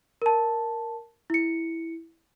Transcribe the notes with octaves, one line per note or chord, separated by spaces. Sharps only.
A#4 A5
E4 C#7